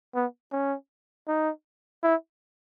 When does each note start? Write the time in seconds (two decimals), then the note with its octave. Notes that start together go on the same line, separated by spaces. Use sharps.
0.15 B3
0.52 C#4
1.28 D#4
2.03 E4